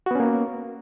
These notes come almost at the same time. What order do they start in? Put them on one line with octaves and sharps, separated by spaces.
F#4 B3 C#4 A#3